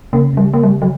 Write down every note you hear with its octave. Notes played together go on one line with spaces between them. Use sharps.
C#3 A#3
C#3 G3
A#3
G3
F#3